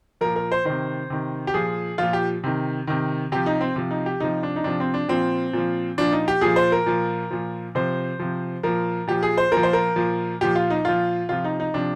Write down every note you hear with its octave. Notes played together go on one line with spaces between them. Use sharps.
A#2 F3 A#4
A#4
C5
C3 D#3 C5
C3 D#3
G4
A#2 F3 G#4
A#2 F3 F4
G4
C3 D#3
C3 D#3
C3 F3 G4
D#4
C4
C3 F3
D#4
G4
C3 F3 D#4
D4
D#4
C3 F3 D4
C4
D4
A#2 F3 C4
A#2 F3
A#2 F3 D4
D#4
G4
A#2 F3 G#4
C5
A#4
A#2 F3
A#2 F3
C3 F3 C5
C3 F3
A#2 F3 A#4
A#2 F3 G4
G#4
C5
A#2 A#4
F3
C5
A#4
A#2 F3
A#2 F3 G4
F4
D#4
A#2 F3 F4
C3 F3 F4
D#4
D#4
C3 F3 D4